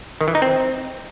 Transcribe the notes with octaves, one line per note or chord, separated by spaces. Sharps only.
D#3
E3
D#4
C4